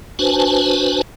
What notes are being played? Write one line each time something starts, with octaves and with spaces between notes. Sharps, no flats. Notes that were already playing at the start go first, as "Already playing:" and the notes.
D4 F#4 B4 C5 G#5 A5